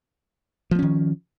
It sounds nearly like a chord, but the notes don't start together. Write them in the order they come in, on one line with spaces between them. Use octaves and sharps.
F3 A#3 C#4 D#3